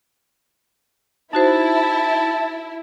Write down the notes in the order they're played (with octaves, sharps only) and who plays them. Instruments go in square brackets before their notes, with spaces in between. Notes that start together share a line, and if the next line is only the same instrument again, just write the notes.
[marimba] D#4 F#4 C5 [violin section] E4 [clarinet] A5